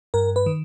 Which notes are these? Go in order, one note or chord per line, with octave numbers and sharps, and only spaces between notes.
G2 A#4
B4
D#3